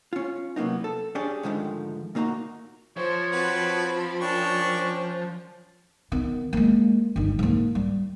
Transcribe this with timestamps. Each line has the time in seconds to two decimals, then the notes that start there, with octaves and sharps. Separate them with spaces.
0.13 C#4 F4
0.56 C3 F#3 A#3 B3 D#4
0.84 A4
1.15 C#4 D4 G4 G#4 D5
1.43 G#2 D3 D#3 F3 G#3 A3
2.15 A#2 A#3 D#4 F#4 A#5
2.97 F3 C5 C#5
3.32 C4 F#4 B4 B5
4.21 C#4 D4 A#4 G5 C#6
6.12 D#3 B3
6.53 G#3 A#3
7.16 G1 D#4
7.39 G#2 A#3
7.75 G3